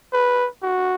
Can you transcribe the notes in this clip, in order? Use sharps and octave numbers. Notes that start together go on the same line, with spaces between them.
B4
F#4